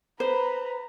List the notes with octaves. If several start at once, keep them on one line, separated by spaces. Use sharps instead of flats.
B4 C5 A#5